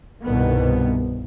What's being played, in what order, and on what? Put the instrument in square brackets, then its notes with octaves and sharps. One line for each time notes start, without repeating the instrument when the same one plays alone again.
[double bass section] C2 G2 B2 D#3 B3